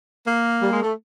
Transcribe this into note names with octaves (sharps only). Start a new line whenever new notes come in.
A#3
G3
G#3
A3